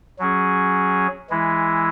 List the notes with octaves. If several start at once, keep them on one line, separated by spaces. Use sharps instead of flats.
F#3 C#4 G#4
E3 G#3 E4